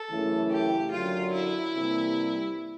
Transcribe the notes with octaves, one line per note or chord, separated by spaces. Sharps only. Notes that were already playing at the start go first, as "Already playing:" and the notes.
Already playing: A4
F#2 C#3 E3 A3
G4
F#2 D3 F#3 F4
E4
C3 E3 G3 A#3